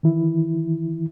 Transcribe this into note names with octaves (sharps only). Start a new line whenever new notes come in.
D#3 E3 E4